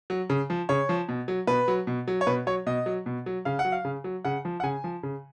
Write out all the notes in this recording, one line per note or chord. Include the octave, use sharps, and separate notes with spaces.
F#3
C#3
F3
C#3 C#5
F3
B2
F#3
B2 B4
F#3
B2
F#3
C#5
B2 B4
F#3 C#5
B2 D#5
F#3
B2
F#3
C#3 F5
F#5
F#3
F5
C#3
F#3
C#3 F#5
F3
F#5
C#3 G#5
F3
C#3